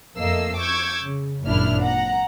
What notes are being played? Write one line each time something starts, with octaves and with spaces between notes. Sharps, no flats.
F2 A3 A#3 D#5 E6 C7
C#6 D6 E6 G6 G#6
C#3
G#1 F#2 A#2 D4 E4 F6
F#5 A#5